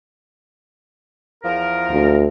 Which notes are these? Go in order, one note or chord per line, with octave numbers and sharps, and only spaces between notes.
E2 F3 A#4
D2